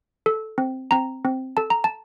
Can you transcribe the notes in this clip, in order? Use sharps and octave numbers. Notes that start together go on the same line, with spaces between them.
A4
C4
C4 A#5
C4
A4 A5
A#5
A5